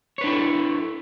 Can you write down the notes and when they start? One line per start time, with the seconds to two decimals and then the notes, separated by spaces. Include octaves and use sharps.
0.18 C#5
0.21 B4
0.24 D4
0.26 E4
0.29 A4